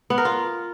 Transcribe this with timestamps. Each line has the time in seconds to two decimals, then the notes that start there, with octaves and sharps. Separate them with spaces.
0.10 B3
0.18 A#4
0.25 F4